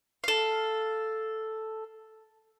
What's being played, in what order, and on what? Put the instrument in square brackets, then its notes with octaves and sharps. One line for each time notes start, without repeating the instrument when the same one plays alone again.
[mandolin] A4 F5